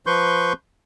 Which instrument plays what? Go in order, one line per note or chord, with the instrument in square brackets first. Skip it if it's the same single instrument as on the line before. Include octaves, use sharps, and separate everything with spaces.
[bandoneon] F3 B4 C6 C#6 G6